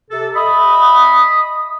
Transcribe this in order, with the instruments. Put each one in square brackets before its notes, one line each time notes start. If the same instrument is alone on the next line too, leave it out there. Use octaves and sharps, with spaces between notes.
[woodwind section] C3 A4
[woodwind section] D#5 E5 B5 [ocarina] D#6